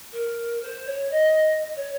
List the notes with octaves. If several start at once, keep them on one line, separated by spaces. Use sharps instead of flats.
A#4
C5
C#5
D#5
C#5